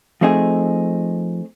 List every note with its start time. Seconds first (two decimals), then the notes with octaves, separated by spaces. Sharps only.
0.21 F3 A3 C4 D#4 G#4